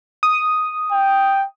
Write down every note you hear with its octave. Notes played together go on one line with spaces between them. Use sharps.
D#6
G5